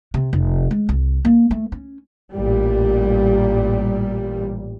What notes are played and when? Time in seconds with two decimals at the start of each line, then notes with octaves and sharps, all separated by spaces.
0.14 C3
0.33 F1
0.71 G#3
0.89 C2
1.25 A#3
1.51 A3
1.72 C#4
2.32 A1 A#2 G3